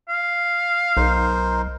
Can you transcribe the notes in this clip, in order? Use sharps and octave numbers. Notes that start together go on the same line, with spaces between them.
F5
B1 D#4 A#4 C5